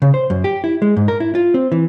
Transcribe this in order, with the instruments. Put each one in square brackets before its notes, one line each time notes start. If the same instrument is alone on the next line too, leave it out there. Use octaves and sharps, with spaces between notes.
[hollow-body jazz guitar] C#3
C5
F#2
G4
E4
G#3
G#2
A#4
E4
F4
C4
E3